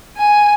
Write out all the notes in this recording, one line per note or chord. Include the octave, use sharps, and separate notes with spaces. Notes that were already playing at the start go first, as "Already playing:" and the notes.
G#5